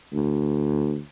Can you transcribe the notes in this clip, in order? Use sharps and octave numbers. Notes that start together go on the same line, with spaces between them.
D2